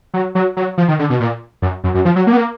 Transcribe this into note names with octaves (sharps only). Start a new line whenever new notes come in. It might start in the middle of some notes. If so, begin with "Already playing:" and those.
F#3
F#3
F#3
F3
D#3
D3
B2
A#2
F#2
F#2
F#2
F3
F#3
A#3
B3
A#3